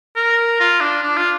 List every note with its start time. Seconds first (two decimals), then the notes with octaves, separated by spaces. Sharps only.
0.16 A#4
0.60 F4
0.81 D4
1.03 D4
1.17 F4